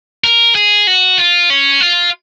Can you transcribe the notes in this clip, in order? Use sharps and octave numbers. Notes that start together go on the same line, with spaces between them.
A#4
G#4
F#4
F4
C#4
F4